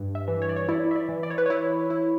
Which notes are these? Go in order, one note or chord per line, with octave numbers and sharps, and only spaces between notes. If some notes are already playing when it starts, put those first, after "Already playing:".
Already playing: G2
E5
E3
C#5
D5
C#5
E4 D5
E5
D5
E3
D5
C#5
B4
E4 C#5
E4